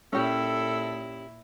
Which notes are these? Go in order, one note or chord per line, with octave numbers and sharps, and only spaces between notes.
A#2 C#4 E4 G4 A4